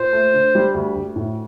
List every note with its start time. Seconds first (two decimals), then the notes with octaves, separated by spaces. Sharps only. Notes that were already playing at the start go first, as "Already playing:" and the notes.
Already playing: A#2 C5
0.13 A3
0.34 D3
0.55 G3
0.74 D2
0.96 D2
1.16 A2